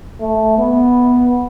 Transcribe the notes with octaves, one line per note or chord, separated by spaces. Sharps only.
A3
B3